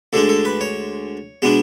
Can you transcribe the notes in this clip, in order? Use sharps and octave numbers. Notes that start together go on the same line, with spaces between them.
D2 D3 G#3 D4 A4
A4
B4
C#5
B2 G#3 B3 D4